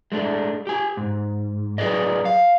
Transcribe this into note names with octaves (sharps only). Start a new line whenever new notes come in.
G#3 A3 D4
G4 G#5
G#2
F#3 G#4 B4 D5 D#5
F5